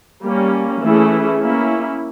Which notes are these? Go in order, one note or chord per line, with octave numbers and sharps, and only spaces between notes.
G3 A#3 C#4
E3 A3 C#4 E4 G#4
A#3 C#4 E4